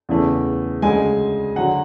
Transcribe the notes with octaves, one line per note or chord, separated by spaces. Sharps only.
E2 C#3 E3 A3
D2 C#3 G#3 G#5
D3 F#3 F#5